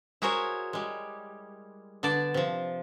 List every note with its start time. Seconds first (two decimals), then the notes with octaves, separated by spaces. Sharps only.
0.22 E4 F#4 G#4 A#4 C5 C#5
0.73 G3 G#3
2.03 D3 B3 D5 A5
2.34 C3 F3